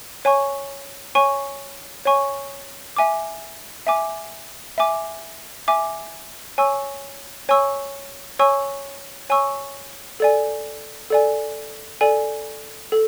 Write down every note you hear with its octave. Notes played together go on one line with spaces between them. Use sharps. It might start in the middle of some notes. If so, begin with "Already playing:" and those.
C#5 G#5 C#6
C#5 G#5 C#6
C#5 G#5 C#6
E5 G#5 D6
E5 G#5 D6
E5 G#5 D6
E5 G#5 D6
C#5 G#5 C#6 E6
C#5 G#5 C#6 E6
C#5 G#5 C#6 E6
C#5 G#5 C#6 E6
A4 D5 G#5
A4 D5 G#5
A4 D5 G#5
A4